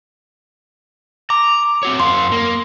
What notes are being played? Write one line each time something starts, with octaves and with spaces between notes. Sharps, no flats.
A#5 D6
C4 F#4 C#5
F#2 F5 C6
A#3